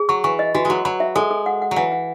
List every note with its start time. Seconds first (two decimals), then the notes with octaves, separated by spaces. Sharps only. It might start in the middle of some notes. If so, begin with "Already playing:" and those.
Already playing: G#4
0.09 F#3 C#6
0.24 E3 C#6
0.39 D#5
0.55 E3 F#4
0.65 F#3 G#3 F#4
0.85 F#3 B5
1.00 E5
1.16 G#3 A4
1.31 A4
1.46 F#5
1.62 F#5
1.71 F#3
1.76 E3 F#5
1.92 F#5